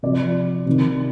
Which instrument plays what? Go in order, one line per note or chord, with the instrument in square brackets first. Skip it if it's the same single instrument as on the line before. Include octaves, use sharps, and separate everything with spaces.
[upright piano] C3 F3 D5
C3 D#3